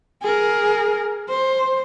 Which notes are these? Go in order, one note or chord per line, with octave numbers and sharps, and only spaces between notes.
G#4 A#4
C5